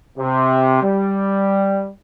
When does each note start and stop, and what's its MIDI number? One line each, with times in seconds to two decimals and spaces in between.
0.18 0.82 48
0.83 1.90 55